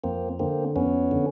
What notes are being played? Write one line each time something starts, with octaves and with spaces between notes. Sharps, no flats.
F2 A#3 C4
D3 A#3 C4
F2 B3 C#4
D3